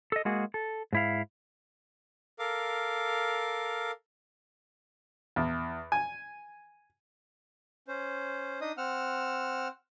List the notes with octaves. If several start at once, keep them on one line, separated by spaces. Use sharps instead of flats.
A4 D#5
G#3 A#3 F#4 G#4
A4
G#2 E4 F5
A4 A#4 F5 D6
E2
G#5
C#4 C5
D4 D#4 D#5 D#6
C4 F#5 E6 F6